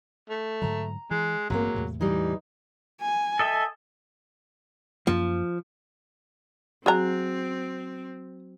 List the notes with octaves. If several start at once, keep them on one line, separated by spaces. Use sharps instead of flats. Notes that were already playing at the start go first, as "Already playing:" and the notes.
A3
G#2 D3 F#3 A#5
E3 G#3
A1 G2 F#3 G#3 A#3 C4
E2 A2 C3
E3 G3 D#4
G#5
A4 D#5 E5
F#2 F3 A#3
F#3 C4 F#4 G#4 A#5